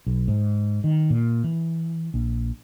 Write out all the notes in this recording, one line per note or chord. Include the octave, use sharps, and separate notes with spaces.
B1
G#2
D#3
A#2
E3
A#1